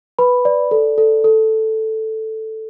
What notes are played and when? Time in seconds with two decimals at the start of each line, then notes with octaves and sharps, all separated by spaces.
0.19 B4 B5
0.45 D5
0.71 A4
0.98 A4
1.24 A4